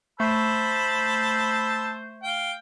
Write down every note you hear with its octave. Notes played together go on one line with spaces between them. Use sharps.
A3 C5 A5 B5 E6
F5 G5